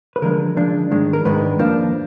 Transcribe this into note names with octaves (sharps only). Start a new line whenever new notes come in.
B4
D3 F3 G#3 D4 A#4
D3 F3 G#3 D4
G#2 D#3 G#3 D4
A#4
G#2 D#3 G#3 D4 B4
F2 F3 A#3 D4